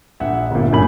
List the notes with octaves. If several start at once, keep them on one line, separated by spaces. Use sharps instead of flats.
A#1 E5 F#5
G1 A#2
F#2 A2 F#3 A#3 B5 F#7